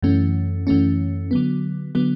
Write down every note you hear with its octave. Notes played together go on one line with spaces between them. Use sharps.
F#2 E3 A3 C#4
F#2 E3 A3 C#4
D3 F#3 B3
D3 F#3 B3